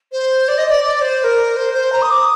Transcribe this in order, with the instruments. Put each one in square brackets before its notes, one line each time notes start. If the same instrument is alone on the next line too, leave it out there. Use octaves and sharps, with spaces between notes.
[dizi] C5
D5
D#5
D5
D5
C5
C5
A#4
C5
C5
A#5
D#6
D6
D#6